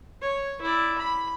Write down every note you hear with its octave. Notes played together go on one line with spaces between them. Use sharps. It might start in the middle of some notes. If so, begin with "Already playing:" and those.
C#5
E4 D5
B5